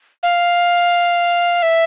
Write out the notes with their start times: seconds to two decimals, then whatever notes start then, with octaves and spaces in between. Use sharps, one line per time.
0.23 F5
1.62 E5